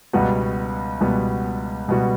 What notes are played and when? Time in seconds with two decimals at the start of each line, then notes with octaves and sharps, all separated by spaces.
0.13 C#2 B2 G3 B3 F#4
1.00 C#2 B2 G3 B3 F#4
1.88 C#2 B2 G3 B3 F#4